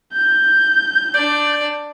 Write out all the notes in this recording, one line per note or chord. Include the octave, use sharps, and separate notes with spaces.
G6
D4 D5